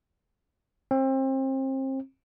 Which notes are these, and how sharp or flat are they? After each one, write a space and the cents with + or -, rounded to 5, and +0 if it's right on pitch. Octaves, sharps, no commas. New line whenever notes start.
C4 +30